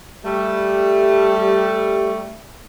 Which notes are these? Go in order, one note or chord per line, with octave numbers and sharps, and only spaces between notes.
G3 A3